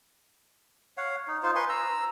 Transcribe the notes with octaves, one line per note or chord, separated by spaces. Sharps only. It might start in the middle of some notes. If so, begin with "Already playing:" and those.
C#5 F5 F#5
D#4
D#4 F4 C5
B4 G#5 C6 C#6
A#5 E6